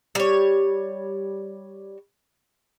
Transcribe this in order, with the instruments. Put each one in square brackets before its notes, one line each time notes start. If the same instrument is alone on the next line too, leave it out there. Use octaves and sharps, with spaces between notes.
[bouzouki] G3 C#5